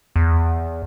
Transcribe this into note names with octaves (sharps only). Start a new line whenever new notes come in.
E2